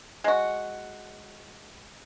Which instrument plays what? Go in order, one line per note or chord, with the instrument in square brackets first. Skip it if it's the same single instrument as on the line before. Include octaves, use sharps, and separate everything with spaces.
[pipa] G#3 F#4